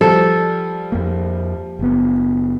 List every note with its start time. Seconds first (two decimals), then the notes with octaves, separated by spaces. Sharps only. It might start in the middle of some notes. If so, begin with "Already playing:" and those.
0.01 F3 G3 A4
0.92 F2 A#3
1.79 F#1 B3